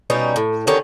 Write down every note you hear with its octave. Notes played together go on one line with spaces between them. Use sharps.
B2 G3 C#4 D#4
A2
D3 D#3 C#4 G4